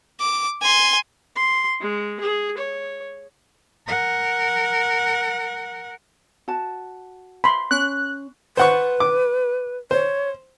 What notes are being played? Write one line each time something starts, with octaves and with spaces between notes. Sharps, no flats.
D6
G#5 C6
C6
G#3
G#4
C#5
A#4 F#5
F#4 A5
B5 C6
C#4 F#6
B4 C5 F#5 C#6
D6
C5 C#5